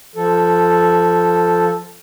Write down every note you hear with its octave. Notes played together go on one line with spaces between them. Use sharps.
F3 A4